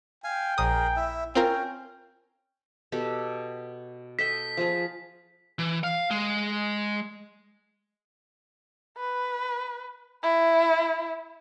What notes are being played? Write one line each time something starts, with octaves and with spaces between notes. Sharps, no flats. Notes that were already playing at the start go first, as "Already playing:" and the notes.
F5 G5 G#5
A#1 G#4 A#4 D#6
E4 E5
C4 C#4 F4 A#4 G5
B2 G4 A4
A4 D#5 G5 B6
F3 F4 G#4
E3
F5
G#3
B4
E4